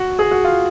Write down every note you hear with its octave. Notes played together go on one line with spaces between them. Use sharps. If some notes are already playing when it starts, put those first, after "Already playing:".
Already playing: F#4
G#4
F#4
F4